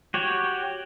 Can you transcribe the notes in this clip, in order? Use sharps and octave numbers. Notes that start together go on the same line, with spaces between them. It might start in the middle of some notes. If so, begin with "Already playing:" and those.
F#4 G4 C#5